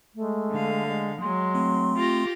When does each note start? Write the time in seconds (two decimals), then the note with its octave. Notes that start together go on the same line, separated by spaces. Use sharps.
0.15 G#3 A3
0.52 D3 F5
0.86 G#3
1.21 F#3 G#3 C6
1.55 A3 C4
1.97 F4 G4 A#6